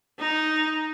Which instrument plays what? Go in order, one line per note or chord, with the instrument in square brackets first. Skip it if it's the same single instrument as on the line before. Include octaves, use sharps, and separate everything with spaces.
[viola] D#4